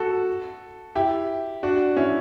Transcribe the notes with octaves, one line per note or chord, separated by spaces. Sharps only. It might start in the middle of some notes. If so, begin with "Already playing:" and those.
Already playing: F#4 A4
E4 G4
D4 F#4
C#4 E4